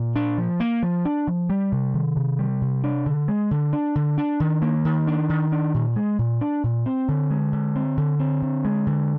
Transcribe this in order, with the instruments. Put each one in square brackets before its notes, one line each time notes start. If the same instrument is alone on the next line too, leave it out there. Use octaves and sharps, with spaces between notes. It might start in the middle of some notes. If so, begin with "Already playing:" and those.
Already playing: [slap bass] A#2
D4
F3
A#3
F3
D4
F3
G3
C3
D#3
C3
G3
C3
D4
D3
G#3
D3
D4
D3
D4
D#3
A#3
D#3
D4
D#3
D4
A#2
G#3
A#2
D4
A#2
C4
D3
G#3
D3
C4
D3
C4
D3
G#3
D3